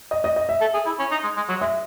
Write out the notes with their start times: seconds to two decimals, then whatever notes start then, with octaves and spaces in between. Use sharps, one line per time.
0.11 D#5
0.24 D#5
0.36 D#5
0.49 E5
0.61 A4
0.74 G#4
0.86 E4
0.99 C#4
1.11 D#4
1.24 G#3
1.37 G#3
1.49 F#3
1.61 G#3 E5